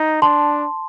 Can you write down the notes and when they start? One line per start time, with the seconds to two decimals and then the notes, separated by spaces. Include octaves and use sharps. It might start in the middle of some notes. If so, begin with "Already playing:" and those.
Already playing: D#4
0.22 D4 A5 C6